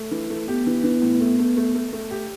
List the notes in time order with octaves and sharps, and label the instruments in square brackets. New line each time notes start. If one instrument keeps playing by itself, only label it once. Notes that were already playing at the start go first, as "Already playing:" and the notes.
Already playing: [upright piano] A3
E3
A3
[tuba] B3 [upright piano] G4
[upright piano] E3
E3
A2
A3
A3
A3
A3
A3
G4